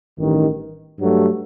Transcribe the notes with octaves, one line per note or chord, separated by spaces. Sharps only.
A1 G2 D#3
G2 F#3 A3